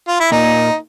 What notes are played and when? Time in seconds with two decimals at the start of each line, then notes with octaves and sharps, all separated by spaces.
0.08 F4
0.20 E4
0.32 A#2 D#4